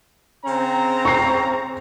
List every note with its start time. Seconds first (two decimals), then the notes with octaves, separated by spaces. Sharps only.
0.45 C#3 C4 A#5
1.05 C#6 C7